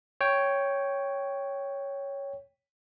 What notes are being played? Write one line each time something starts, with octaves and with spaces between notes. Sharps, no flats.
C#5 G5